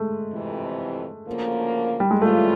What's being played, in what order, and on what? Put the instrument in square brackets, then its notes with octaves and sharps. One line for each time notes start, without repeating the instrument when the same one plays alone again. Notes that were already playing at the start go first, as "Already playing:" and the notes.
Already playing: [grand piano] G#3 A3
[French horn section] F2 C3 E3
D2 C#3 F3 A#3
[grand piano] G3
G#3
[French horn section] C#3 E3 G3 C4 F4 [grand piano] A3